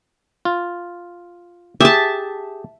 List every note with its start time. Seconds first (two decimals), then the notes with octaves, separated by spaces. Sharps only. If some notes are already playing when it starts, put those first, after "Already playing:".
0.45 F4
1.81 G4 G#4 E5 A5